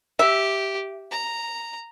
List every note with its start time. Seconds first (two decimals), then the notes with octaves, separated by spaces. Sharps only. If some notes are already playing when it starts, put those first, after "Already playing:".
0.19 G4 E5
1.12 A#5